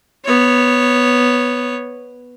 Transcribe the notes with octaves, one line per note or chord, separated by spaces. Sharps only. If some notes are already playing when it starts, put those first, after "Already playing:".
B3 C#5